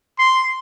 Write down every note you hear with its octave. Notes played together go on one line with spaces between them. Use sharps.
C6